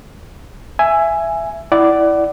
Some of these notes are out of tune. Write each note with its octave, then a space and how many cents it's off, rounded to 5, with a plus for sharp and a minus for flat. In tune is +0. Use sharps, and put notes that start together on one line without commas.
E5 +15 G#5 +0
E4 +0 D5 +0 F#5 +25